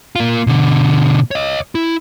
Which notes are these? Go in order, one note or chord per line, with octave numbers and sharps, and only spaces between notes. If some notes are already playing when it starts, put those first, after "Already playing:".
A#3 F4
B2 D3
C#5 D#5
E4